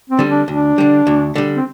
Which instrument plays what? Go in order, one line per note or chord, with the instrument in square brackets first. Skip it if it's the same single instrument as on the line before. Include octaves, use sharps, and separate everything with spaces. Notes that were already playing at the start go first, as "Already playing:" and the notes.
[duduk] C4
[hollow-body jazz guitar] D3 G3
[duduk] D4
[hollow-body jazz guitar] D2 [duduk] D4
[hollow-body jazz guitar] D3 G3
D2
D3 G3
[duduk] C4